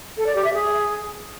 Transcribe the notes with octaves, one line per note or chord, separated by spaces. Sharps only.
A4
D5
G4
E5
G#4